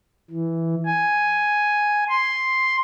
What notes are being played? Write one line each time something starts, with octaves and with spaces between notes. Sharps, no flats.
E3
G#5
C6